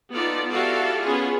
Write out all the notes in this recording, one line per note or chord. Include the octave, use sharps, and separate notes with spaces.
B3 D#4 F4 A4 D5
E4 F#4 G4 A4 D5 F5
B3 C#4 F4 G#4